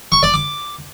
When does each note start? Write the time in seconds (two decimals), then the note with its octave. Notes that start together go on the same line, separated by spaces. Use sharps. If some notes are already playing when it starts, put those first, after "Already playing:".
0.12 C#6
0.23 D5
0.34 D6